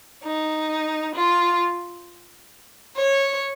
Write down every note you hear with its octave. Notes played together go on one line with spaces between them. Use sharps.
D#4
F4
C#5